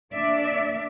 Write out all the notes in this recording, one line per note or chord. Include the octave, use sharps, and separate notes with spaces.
A#3 D4 D5 E5